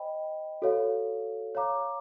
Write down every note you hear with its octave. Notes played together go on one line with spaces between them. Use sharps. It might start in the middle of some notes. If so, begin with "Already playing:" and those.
Already playing: C5 D#5 G5 B5
F#4 A4 C#5 F5
C#5 F5 A#5 D6